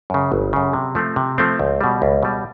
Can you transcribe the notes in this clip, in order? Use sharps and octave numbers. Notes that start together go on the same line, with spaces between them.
F#2 C#3
G1
F#2 C#3
C3
F3 A3 C4
C3
F3 A3 C4
C#2
B2 G3
C#2
B2 G3